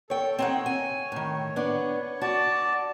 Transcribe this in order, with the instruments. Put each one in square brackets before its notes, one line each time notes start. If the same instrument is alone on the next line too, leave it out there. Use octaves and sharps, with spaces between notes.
[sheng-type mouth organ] A4 [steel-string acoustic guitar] C#5 G5
[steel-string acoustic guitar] C4 D#4 F#5 [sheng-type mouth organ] C#5
[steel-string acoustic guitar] G#5
A2 D#3
B3 D4
[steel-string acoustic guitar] F#4 [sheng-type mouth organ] D5 A5